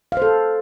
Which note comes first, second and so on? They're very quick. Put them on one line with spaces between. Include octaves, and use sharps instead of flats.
F5 C5 A4